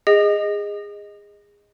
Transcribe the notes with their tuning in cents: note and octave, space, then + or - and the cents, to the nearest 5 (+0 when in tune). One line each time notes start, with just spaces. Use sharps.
G#4 -20 D#5 +0